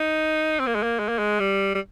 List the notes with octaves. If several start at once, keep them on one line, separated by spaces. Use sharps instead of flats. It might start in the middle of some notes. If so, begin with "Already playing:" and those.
Already playing: D#4
C4
A#3
G#3
A#3
G#3
A#3
G#3
G3
G3